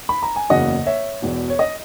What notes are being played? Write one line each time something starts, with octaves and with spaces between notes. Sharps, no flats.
B5
A#5
G#5
F#1 E2 C#3 F#3 A#3 D#5 F#5
C#5 E5
E1 E2 B2
C#5
D#5